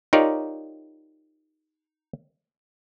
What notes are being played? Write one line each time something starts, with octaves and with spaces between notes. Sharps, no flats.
D#4 F4 G4 A#4 C#5 D5